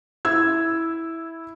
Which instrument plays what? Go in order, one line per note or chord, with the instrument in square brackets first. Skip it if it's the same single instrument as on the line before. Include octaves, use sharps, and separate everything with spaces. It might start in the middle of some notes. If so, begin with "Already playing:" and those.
[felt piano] E4 E6 G#6